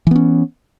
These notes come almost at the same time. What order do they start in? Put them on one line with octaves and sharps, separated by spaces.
E3 B3 C#4